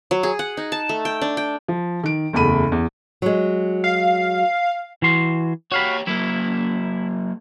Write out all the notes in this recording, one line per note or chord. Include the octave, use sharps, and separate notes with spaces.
F#3
G#4
F#5
D#4
A5
A3
G5
D4
G5
F3
D#3 D7
F#1 E2 A3 B5 D#7
E2
F#3 G#3
F5
E3 F#4 C6
F#4 G4 C#5 F5 B5
F#3 A#3 E4